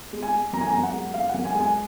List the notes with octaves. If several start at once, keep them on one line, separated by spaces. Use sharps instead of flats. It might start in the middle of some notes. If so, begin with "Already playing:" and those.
G#3
G#5
G#3
F#2 A#5
G#5
A#5
F#2
F#5
G#3
G#3 F5
F#5
F#2
G#5
G#3
G#5